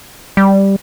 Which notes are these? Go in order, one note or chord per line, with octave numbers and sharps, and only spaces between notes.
G3